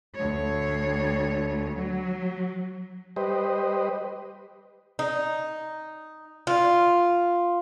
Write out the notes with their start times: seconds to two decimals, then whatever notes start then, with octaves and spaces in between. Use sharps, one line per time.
0.15 D2 C#5
1.77 F#3
3.16 G3 G4 B4 C5 D#5
4.99 D#4
6.47 F4